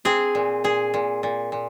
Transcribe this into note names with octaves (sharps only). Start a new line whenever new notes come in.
C4 G#4
A#2
A#2 G#4
A#2
A#2
A#2